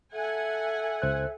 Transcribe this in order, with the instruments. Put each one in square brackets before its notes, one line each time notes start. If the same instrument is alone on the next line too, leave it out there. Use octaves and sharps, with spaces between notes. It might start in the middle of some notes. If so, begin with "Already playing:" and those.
[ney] A4 [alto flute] E5 [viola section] F#5 G#5
[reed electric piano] C#2 C5 F#6